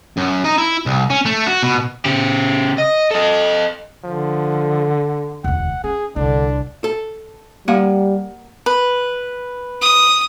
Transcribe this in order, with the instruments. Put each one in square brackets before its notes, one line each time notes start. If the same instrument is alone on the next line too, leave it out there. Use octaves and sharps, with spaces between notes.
[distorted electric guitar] F#2
D#4
E4
C2
C#4
A3
F#4
B2
[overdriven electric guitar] C#3 G4
D#5
A4 D#5
[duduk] D3 [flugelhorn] F3
[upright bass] E1 D2 [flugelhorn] F#5
[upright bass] C#4 [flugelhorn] G#4
[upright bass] C2 [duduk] D3 [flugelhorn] D4
[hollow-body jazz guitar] A4
[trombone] G3 [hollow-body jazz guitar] A#3 F#5 G#5
[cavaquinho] B4
[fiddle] D#6